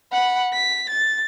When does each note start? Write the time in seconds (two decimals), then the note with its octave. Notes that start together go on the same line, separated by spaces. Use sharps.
0.12 F#5 B5
0.54 B6
0.89 A6